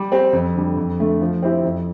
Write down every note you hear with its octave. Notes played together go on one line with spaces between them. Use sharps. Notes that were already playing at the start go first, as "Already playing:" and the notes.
Already playing: G3
C4 G4 C5
F2
D3 G3
F2
D3 A3
F3
C4 E4 G4
F2